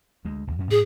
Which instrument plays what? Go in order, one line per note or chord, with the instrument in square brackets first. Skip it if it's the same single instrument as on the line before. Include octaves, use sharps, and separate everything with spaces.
[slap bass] D2 G#3
D1 D#2
F2 C#4
[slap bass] G#2 [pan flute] G#4